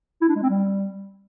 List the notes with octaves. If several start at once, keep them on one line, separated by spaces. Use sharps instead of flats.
E4
D4
G#3
C4
G3